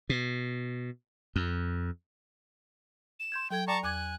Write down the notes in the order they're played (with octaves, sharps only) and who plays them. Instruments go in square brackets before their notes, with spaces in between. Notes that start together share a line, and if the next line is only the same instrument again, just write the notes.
[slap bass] B2
F2
[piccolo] E7
[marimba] C6 G6 G#6
[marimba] F#3 A4 G#6 [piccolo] G5
[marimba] D5 G5 D6 [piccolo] A5 [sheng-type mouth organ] A#5 C#6
[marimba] E2 D6 G#6 [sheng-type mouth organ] G#5 [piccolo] F#6